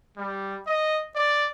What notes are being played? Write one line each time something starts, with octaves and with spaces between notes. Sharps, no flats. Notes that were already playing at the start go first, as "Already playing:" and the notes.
G3
D#5
D5